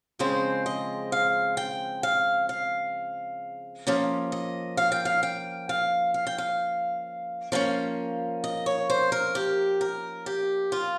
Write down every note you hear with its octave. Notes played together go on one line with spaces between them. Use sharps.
C#3 F3 G#3 C4 C5
D#5
F5
G5
F5
F5
F3 A#3 C#4
D#5
F5
G5
F5
G5
F5
F5
G5
F5
F3 A#3 C#4
D#5
C#5
C5
A#4
G4
A#4
G4
F4